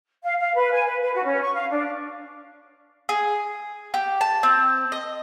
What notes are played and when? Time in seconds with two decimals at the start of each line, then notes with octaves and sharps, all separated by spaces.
0.23 F5
0.38 F5
0.55 B4
0.71 G#5
0.86 B4
1.01 B4
1.14 F#4
1.25 C#4
1.42 C#6
1.54 F5
1.70 D4
3.09 G#4
3.94 G4
4.21 A5
4.43 C4
4.92 D#5